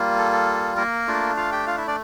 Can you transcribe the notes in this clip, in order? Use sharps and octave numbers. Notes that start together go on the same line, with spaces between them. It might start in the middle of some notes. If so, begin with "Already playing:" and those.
Already playing: G3 A#3 F4
A4
A4
A#3 A#4
A3 D4 F4
F4 F5
G4 G5
F4 F5
E4 E5
D4 D5